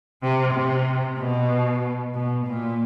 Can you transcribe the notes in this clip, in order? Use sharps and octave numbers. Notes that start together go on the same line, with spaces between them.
C3
C3
B2
B2
A#2